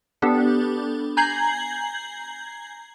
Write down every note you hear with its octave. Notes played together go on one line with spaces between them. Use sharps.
B3 D4 G4 A4
G#5 A#5 G6 G#6 C7 F#7